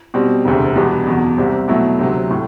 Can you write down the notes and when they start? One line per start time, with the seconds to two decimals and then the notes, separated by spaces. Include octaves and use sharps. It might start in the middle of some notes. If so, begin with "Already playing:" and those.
0.14 B2 G3 C4
0.45 E1 D2 C3
0.76 E2 B2 G3 B3 D4
1.07 F#1 E2 B2
1.37 C2 C3 G3 C4
1.68 B2 F#3 A3 E4
1.99 D2 C3 F#3
2.31 A2